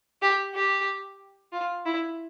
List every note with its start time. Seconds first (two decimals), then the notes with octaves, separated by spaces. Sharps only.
0.22 G4
0.54 G4
1.53 F4
1.86 E4